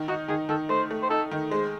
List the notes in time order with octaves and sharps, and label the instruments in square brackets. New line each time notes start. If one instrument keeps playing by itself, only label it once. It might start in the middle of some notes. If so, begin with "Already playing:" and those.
Already playing: [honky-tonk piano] D#3
[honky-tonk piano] D#4 [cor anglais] F#4
[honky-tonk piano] D#3 [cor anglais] G#4
[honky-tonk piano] D#3 [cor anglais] A4
[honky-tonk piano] A3 [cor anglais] C5
[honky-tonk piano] A3
[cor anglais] C5
[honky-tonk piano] D#4 [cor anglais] A4
[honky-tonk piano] D#3
[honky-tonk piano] G#3 [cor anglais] C5